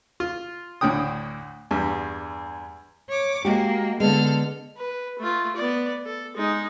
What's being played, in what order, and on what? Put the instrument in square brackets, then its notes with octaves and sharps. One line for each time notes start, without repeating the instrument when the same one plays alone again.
[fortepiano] F4
D2 A2 D3 G5 D#6
E2 G2
[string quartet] C#5 D6
[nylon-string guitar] G#3 F#4 G4 [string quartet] A#3
[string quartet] D3 A4 F6 [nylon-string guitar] G#3 B3
[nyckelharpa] B4
A3 F4
B3 D5
A4
G#3 D#4